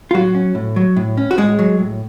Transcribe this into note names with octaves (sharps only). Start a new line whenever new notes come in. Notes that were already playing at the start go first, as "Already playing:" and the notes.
F4
A2 F#3 F#4
C#4
A2
F#3
A2
C#4
F#4
A2 G#3 G#4
F#3
A2